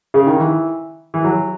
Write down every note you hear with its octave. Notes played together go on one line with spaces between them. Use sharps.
C#3
D#3
E3
E3
F#3